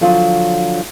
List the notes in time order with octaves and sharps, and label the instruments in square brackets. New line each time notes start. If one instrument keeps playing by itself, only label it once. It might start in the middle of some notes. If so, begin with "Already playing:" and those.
[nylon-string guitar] D3 F3 F#3 F4